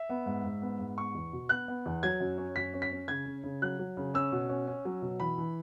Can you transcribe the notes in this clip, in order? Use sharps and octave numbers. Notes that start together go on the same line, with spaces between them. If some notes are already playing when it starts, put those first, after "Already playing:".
Already playing: E5
B3
G#2
G#2
B3
G#2
B3 C#6
E2
B2
B3 F#6
B3
E2
F#3 G#6
F#2
C#4
F#2 B6
C#4
B6
C#4
C#3 G#6
C#3
C#3
F#3 F#6
F#3
C#3
C#4 E6
B2
C#4
C#4
F#3
B2
E3 B5
E3